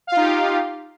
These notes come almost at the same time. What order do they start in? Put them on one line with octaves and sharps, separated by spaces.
F5 F4 D#4 G4